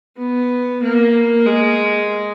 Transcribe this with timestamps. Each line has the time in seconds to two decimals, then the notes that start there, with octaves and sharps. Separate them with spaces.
0.17 B3
0.82 A#3
1.46 G#3